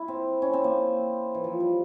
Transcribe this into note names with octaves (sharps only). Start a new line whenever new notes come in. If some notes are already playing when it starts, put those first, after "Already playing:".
Already playing: E4
C4
C#4
C4
A#3
E3
F3
G3